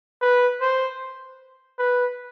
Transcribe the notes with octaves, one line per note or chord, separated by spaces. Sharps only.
B4
C5
B4